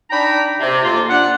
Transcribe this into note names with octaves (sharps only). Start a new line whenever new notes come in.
D4 D#4 G5 A#5 B5
C3
F2 A#3 F4
D4 F#5